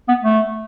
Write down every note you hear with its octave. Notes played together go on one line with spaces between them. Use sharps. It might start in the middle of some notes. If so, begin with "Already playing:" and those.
B3
A3